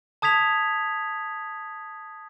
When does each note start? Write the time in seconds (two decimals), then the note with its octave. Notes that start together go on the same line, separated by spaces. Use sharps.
0.22 A5 D#6 G#6 B6 F7